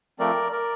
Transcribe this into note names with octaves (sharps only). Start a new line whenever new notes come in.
F3 A3 C4 A#4 D5
A#4 D5